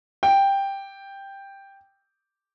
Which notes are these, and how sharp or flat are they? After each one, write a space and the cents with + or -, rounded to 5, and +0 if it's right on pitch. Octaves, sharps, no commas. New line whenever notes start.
G5 +5